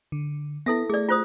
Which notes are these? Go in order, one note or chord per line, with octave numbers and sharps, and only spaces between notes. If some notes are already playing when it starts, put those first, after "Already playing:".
D3
B3 E4 A4 E5
A3 G#4 D5
F4 C5 D#6